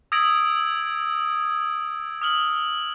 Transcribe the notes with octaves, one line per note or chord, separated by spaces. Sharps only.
D#6 E6 G#6 A#6 D7 F#7
D#6 F6 F#7